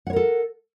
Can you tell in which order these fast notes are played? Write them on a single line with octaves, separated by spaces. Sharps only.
F#5 C#5 A#4 A4